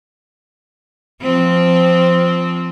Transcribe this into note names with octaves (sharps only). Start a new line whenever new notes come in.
F3 C4